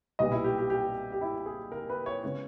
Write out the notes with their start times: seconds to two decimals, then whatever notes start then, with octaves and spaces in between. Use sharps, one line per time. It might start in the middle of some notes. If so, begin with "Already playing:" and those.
0.19 B1 A#2 G3 B3 D#5
0.32 E4
0.44 G4
0.58 G4
0.70 G4
1.12 G4
1.21 E4
1.46 G#4
1.72 A#4
1.89 B4
2.06 C#5
2.23 C#3 G#3 B3 C#5